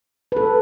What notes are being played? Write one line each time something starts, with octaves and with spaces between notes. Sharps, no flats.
B4
A4